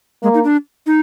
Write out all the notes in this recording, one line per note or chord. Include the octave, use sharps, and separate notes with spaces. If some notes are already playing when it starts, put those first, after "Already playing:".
G#3 A#3
D#4
D4
D#4